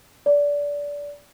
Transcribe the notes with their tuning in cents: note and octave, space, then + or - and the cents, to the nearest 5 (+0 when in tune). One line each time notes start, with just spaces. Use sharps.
D5 -20